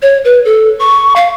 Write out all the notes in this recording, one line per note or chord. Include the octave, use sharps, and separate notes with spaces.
C#5
B4
A4
C#6
F5